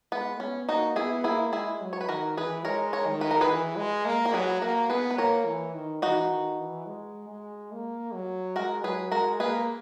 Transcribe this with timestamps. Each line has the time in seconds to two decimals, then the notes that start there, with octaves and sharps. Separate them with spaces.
0.12 G#3 B3
0.40 B3 C#4
0.69 A#3 D#4 F#4
0.96 B3 E4 G#4
1.24 A#3 E4 G#4
1.52 G#3 E4 G#4
1.81 F#3
1.93 C#5
2.01 B4
2.09 D#3 F#4 A#4
2.37 E3 G#4 B4
2.65 G#3 A#4 C#5
2.93 A#4 C#5
3.07 D#3
3.21 B4
3.31 A#4
3.41 G#4 B4
3.50 E3
3.77 G#3
4.06 A#3
4.25 A#4
4.33 F#3 G#4 B4
4.62 A#3 F#4 A#4
4.90 B3 G#4 B4
5.11 B4
5.18 A#3 A#4 C#5
5.46 E3
5.74 D#3
6.02 E3 D#4 F#4
6.31 D#3
6.59 E3
6.87 G#3
7.29 G#3
7.72 A#3
8.13 F#3
8.56 G#3 F#4 A#4
8.84 F#3 G#4 B4
9.12 G#3 F#4 A#4
9.40 A#3 G#4 B4